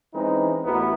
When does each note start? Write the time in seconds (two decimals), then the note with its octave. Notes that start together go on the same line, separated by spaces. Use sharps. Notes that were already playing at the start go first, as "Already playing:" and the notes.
0.14 E3 G#3 C4 C#4 D#4 B4
0.64 A1 B3 E4 F#4 A#4